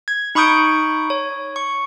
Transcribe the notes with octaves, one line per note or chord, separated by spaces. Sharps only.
G#6
D#4 B5 C#6 D#6 G6 D7
C#5
C#6